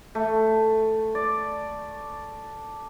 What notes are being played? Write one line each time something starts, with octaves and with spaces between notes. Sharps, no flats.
A3
D5